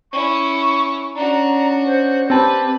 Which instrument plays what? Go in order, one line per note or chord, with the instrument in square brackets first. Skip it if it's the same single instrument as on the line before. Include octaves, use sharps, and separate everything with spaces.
[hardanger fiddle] C#4 E4 [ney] C#6
[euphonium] C#4 [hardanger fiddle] D4 F#4 [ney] A#5
[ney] C5
[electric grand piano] C4 A5 [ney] G4 [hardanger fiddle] B4